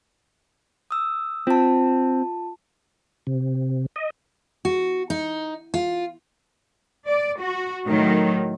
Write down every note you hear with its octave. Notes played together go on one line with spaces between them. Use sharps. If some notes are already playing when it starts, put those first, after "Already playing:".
D#6 E6
C4 F4 A5
C3
D#5
F#4
D#4
F4
D5
F#4
A2 D#3 F#3